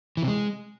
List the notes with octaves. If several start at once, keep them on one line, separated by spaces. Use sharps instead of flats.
E3
C3
G#3